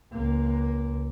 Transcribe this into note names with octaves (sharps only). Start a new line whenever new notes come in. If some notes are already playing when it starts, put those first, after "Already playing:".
C#2 A#3